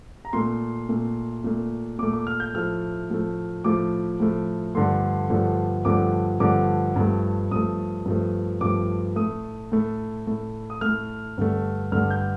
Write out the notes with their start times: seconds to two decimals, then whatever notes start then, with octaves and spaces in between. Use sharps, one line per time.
0.25 A#5
0.33 A#2 A3 C6
0.89 A#2 A3
1.44 A#2 A3
1.99 A#2 A3 D6
2.13 D6
2.27 F6
2.40 G6
2.54 A2 F3 A3 F6
3.10 A2 F3 A3
3.64 A2 F3 A3 D6
4.20 A2 F3 A3
4.75 G2 D3 F3 A3 C6
5.30 G2 D3 F3 A3
5.85 G2 D3 F3 A3 D6
6.40 G2 D3 F3 A3 D6
6.96 G2 F3 A3
7.51 G2 F3 A3 D#6
8.05 G2 F3 A3
8.61 G2 F3 A3 D6
9.16 A2 A3 D#6
9.72 A2 A3
10.27 A2 A3
10.70 D#6
10.81 A2 A3 F6
11.38 G2 D3 A3
11.92 G2 D3 A3 F6
12.11 G6